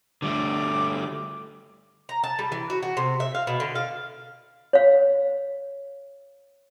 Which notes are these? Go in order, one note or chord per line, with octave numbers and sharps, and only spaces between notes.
D3 G3 A3 D6
A#5
A5
G3
E3
F#4
F#4
C3
E5
F5
B2
D3
F5
C#5 F5